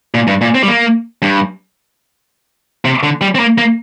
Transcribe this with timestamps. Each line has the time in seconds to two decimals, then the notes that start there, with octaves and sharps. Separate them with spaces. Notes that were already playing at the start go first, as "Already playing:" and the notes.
0.14 A#2
0.27 G2
0.41 A#2
0.55 C4
0.63 G3
0.68 A#3
1.22 G2
2.85 C3
3.03 D3
3.21 G3
3.35 C4
3.40 A#3
3.58 A#3